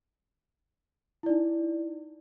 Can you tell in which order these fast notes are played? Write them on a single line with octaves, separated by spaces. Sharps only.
E4 D5 D#4